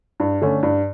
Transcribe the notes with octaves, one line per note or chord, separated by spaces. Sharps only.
G2
D3 A3 C#4
G2